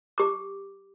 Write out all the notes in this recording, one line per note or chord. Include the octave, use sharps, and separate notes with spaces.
G4 D6